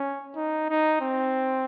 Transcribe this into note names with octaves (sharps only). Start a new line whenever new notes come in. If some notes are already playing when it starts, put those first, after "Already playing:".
Already playing: C#4
D#4
D#4
C4